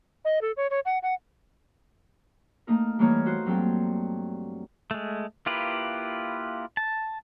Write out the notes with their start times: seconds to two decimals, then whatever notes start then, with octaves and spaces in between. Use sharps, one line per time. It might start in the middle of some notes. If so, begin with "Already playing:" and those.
0.25 D#5
0.42 A4
0.57 C#5
0.70 C#5
0.85 F#5
1.03 F#5
2.67 A3 A#3 D#4 A#4
2.99 E3 G3 A3 A#3 D#4 C#5
3.26 F#4 C5
3.46 G2 F#3 C4 A4 G5
4.91 G#3 A3
5.46 A#3 E4 F4 G4 B4
6.77 A5